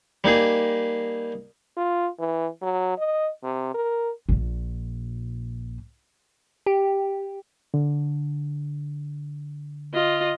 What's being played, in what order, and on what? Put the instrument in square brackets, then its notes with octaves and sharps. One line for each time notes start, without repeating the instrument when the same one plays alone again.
[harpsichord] G3 A#3 D#4 G#4
[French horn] F4
E3
F#3
D#5
C3
A#4
[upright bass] A#1 A#2
[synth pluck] G4
[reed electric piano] D3
[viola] F4 D#5